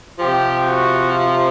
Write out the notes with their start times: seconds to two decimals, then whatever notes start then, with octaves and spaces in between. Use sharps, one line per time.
0.20 C3 F3 G4
0.67 F#4
1.12 F4